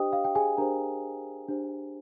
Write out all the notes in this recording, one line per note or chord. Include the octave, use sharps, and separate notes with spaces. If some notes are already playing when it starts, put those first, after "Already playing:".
Already playing: D4 G4 C5 D#5 G5 D#6
F5
G5
G#4 G#5
D4 G4 A#4 C5 A#5
D4 G4 C5